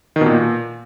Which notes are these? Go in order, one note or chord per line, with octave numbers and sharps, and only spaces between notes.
D#3
B2
A#2